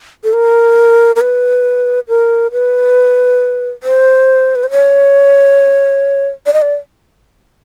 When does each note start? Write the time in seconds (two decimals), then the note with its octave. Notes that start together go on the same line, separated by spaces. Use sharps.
0.24 A4
0.33 A#4
1.16 A#4
1.21 B4
2.08 A#4
2.52 B4
3.83 C5
4.55 B4
4.64 C5
4.71 C#5
6.46 D5
6.53 D#5
6.62 D5